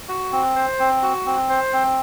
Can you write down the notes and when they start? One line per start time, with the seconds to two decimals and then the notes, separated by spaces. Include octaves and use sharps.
0.08 F#4
0.32 C4
0.56 C5
0.79 C4
1.02 F#4
1.26 C4
1.49 C5
1.73 C4